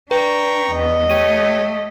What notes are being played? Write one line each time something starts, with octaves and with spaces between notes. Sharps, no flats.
D4 B4 G5 A#5 C#6
E2 B3 D#5
A3 G4 C#5 D#7